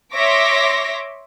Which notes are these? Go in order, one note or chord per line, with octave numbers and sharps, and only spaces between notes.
C#5 E5 C6 D6 A#6 B6